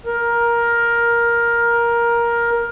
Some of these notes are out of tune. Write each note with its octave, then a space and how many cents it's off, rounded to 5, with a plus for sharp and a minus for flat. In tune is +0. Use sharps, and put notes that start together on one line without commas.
A#4 +10